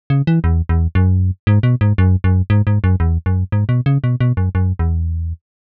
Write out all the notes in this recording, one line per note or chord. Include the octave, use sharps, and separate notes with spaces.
C#3
E3
E2
E2
F#2
G#2
B2
G#2
F#2
F#2
G#2
G#2
F#2
E2
F#2
G#2
B2
C#3
B2
B2
F#2
F#2
E2